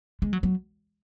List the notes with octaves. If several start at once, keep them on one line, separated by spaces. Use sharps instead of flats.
G#3
F#3
F#3